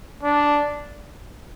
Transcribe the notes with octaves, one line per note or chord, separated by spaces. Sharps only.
D4